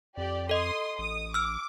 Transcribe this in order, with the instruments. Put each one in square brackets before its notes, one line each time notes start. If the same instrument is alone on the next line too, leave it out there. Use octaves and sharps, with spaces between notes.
[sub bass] F2 [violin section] G4 D5
[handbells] A4 D#5 [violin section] C6 D#6
[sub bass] A1 [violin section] D#6
[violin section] D6 [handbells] E6 F6